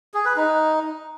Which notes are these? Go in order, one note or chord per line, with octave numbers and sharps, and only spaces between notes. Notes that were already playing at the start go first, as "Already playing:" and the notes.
G#4
B4
D#4